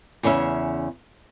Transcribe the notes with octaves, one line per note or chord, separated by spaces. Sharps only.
E2 C#3 C#4 C#5 E5